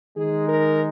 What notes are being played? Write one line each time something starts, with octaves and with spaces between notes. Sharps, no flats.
D#3 G#3 D#4 G#4
A#4